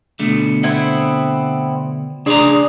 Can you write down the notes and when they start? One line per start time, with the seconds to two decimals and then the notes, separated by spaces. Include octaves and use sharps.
0.19 B2 D3 A3
0.63 B3 C4 E4
2.26 C#3 G#3 D4 G#4 D5 A#5